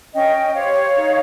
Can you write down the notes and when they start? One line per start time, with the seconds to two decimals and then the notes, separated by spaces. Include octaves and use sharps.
0.14 C#4 D#5 G5
0.54 G4 C5 C#5 F5
0.95 D#4